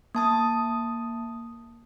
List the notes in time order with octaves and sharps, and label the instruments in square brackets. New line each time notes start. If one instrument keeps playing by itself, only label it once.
[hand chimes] A#3 A5 D#6